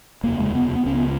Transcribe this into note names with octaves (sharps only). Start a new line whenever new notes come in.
F1 D#2 C#3 A#3
G#3
B3
B3
C#2 C#3 C#4
B3